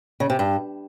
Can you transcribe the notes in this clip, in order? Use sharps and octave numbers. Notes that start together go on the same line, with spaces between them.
C#3
C3
G2